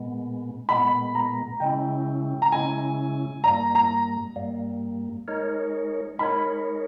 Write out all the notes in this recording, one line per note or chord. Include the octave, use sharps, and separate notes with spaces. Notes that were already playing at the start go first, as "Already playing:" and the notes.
Already playing: A#2 G#3 B3
A#2 G#3 B3 B5
A#5
C#3 G#3 C#4 E4 G5
A#5
C#3 G#3 C#4 E4 G#5
G2 G3 A#3 A#5
A#5
G2 G3 A#3
G#3 D#4 A#4 C#5
G#3 D#4 A#4 C#5 B5